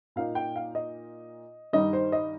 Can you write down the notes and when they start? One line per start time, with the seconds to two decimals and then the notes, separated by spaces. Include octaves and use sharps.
0.16 A#2 A#3 D#4 F5
0.35 G5
0.56 F5
0.75 D#5
1.73 G2 D#3 G3 D#4 D#5
1.93 C5
2.12 D#5